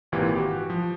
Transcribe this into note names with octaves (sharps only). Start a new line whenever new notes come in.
G#1 A#2 E3 G4
F#4 G4
F3